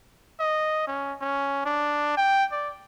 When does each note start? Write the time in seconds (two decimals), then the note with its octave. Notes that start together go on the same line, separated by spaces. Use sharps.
0.40 D#5
0.87 C#4
1.21 C#4
1.65 D4
2.17 G5
2.52 D5